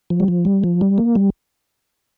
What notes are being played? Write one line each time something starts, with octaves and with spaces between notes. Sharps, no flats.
F3
G3
F3
G3
F3
G3
A#3
G3